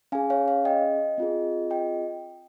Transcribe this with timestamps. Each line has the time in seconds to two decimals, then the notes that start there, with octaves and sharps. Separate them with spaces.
0.12 C#4 G#4 F5 G#5
0.30 C#5 F5
0.48 C#5 F5
0.65 D#5 G5
1.18 C4 F4 G#4
1.70 D#5 G5